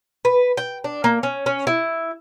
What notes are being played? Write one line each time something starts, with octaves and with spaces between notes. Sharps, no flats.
B4
G5
D4
A#3
C#4
C#4
E4